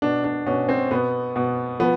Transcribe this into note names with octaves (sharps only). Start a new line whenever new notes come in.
B2 D4
D4
B2 C#4
C4
B2 B3
B2
F3 B3